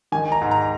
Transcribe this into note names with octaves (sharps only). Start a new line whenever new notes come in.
D#3 G#5
A#5
G#2
A#5